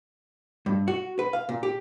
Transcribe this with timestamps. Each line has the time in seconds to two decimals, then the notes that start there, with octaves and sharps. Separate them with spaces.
0.66 G2
0.88 F#4
1.19 B4
1.33 F5
1.49 A#2
1.63 G4